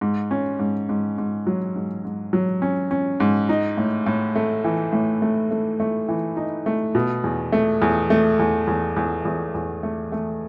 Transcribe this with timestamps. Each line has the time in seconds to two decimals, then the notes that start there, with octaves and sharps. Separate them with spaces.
0.01 G#2
0.31 C#4
0.59 G#2
0.89 G#2
1.18 G#2
1.47 F#3
1.76 G#2
2.05 G#2
2.33 F#3
2.62 C#4
2.91 C#4
3.20 G#2
3.49 D#4
3.77 A2
4.06 A2
4.36 A3
4.64 E3
4.92 A2
5.22 A3
5.51 A3
5.80 A3
6.08 E3
6.37 D#4
6.66 A3
6.95 B2
7.24 E2
7.52 A3
7.82 E2
8.10 A3
8.39 E2
8.67 E2
8.96 E2
9.25 E2
9.55 E2
9.83 A3
10.12 A3